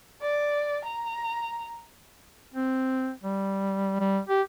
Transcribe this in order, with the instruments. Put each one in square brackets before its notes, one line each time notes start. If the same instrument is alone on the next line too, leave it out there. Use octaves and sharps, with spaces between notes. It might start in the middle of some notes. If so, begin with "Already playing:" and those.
[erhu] D5
A#5
[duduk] C4
G3
G3
G4